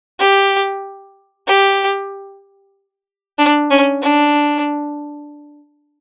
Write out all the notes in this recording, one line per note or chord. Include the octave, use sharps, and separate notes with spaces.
G4
G4
D4
C#4
D4